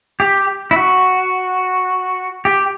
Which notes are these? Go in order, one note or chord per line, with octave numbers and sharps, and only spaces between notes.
G4
E4
F#4
G4